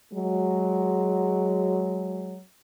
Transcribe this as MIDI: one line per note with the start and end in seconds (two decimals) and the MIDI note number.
0.12 2.39 54
0.12 2.39 56